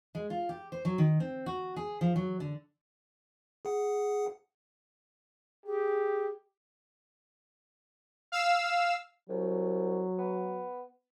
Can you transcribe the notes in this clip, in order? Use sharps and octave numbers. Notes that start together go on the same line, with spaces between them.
G#3
F4
G4
C5
F#3
D#3
C4
F#4
G#4
F3
F#3
D3
G#4 F#5
G4 G#4
F5 E6
C2 F#3
B3